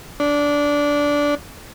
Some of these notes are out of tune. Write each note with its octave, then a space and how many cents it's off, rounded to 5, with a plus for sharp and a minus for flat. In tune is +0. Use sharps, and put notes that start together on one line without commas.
D4 -15